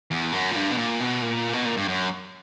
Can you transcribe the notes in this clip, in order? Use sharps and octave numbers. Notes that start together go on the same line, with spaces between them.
E2
F#2
A#2
G2
B2
A#2
B2
A#2
B2
A#2
G2
F#2